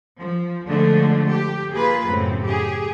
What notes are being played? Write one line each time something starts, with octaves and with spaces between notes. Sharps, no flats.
F3
D3 F3 G#3 A3 D4
G4
A#3 F4 G#4 B4
F#2 A2 C#3 C4
G4 G#4